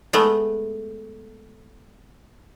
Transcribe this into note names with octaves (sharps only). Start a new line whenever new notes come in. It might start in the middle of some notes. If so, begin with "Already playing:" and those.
G#3 A3 B3